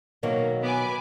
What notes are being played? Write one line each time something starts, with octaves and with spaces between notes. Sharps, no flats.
B2 D#3 F#3 A#3
B3 B4 G#5 D6